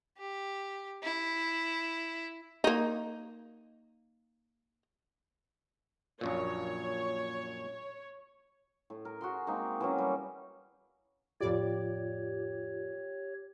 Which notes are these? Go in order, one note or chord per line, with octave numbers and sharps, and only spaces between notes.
G4
E4
A#3 D#4
A#1 F#2 A#2 C#5
A2
A#4
F#4 G#4 C6
G#3 A#3 C4 D#4
E3 F#3 C#4
G3
F2 A2 F4 G4 C#5 D5